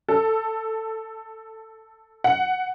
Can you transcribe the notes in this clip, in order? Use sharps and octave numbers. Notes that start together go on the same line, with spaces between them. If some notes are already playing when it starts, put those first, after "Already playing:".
A4
F#5